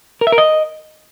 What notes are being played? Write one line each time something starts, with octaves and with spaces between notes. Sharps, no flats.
A#4
E5
A#4
D#5